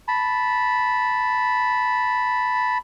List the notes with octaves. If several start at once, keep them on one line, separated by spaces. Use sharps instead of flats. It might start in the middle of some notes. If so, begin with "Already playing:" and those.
A5 B5